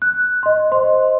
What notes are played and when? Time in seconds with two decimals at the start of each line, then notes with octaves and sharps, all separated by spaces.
0.02 F#6
0.43 D#5 C6
0.72 C5 D#5 C6